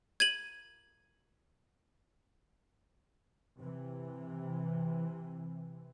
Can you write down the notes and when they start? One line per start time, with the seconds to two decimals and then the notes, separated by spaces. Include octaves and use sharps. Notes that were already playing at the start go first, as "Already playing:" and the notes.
0.20 G#6 D#7 F#7
3.58 C3 E3